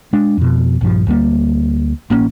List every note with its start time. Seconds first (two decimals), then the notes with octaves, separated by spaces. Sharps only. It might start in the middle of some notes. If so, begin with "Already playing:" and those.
0.13 G#3 D4
0.38 F2 B2
0.81 A#1 G2 F3
1.07 D2 G3 A#3
2.10 A1 A#3 B3 C#4